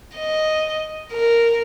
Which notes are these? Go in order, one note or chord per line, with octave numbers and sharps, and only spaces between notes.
D#5
A#4